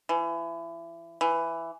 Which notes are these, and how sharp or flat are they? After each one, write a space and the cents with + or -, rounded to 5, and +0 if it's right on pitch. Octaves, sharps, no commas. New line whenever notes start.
E3 +30
E3 +10